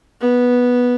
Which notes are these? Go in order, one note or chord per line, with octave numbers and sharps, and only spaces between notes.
B3